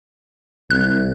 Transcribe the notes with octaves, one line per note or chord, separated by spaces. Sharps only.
C2 F#6